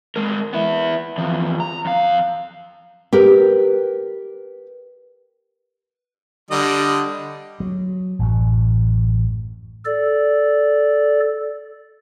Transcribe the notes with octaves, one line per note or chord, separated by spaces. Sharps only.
G#3 A#4
B3 E4
E2 F3
A#5
F2 F5
G4 A#4 B4
D3 G3 D#5
F#3
A1 F#2
A4 D5